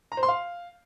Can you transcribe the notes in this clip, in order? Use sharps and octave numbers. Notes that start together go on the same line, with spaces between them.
A#5
C5
C6
F5